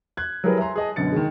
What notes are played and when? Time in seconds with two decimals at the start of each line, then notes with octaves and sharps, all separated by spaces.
0.17 F#6 G#6
0.44 F#3 G3 E4 G#4 A#4 B4
0.58 E5 G#5 A#5 C6
0.76 G#4 D#5 A5
0.96 F#2 B2 D3 A6 C#7
1.12 D#3 G#3